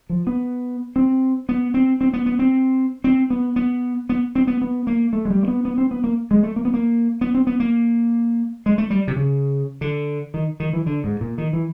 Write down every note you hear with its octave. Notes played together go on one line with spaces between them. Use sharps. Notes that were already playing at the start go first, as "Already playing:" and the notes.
F3
B3
C4
B3
C4
C4
B3
B3
C4
C4
B3
B3
B3
C4
B3
B3
A#3
A3
G#3
G3
A#3
B3
B3
C4
B3
A#3
G#3
A3
A#3
B3
A#3
B3
C4
B3
A#3
G#3
A3
G3
C3
C#3
D3
D#3
D#3
E3
D3
G#2
A#2
D#3
E3